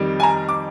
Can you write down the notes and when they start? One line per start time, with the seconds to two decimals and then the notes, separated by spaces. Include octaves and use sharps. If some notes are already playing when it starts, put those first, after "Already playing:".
Already playing: F2 D#3 G3
0.20 G#5
0.23 A#5
0.49 D6